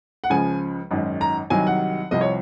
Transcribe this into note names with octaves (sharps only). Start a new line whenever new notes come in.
F#5
C#2 C#3 F3 G#5
G#1 F#2 D#3
A#5
C2 C3 D#3 F#3 G#5
F#5
C2 C3 F3 D#5
C#5